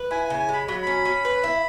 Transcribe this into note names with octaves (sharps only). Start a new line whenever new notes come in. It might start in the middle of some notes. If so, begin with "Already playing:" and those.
Already playing: B4
E4 G#5
G#5
C#3
G#5
G#3 B5
F#3 B5
C#4 B5
C#4
B4
E4